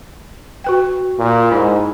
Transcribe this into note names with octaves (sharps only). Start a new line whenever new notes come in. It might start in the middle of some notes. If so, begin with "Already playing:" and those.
F#4 B4 G5
A#2
G#2 E4 A#4